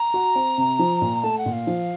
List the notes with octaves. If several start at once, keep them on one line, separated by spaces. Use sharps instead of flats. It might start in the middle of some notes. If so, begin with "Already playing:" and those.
Already playing: A#5
F#4
C4
C3
F3
A#2
A3 A5
F#5
A#2
F5
F3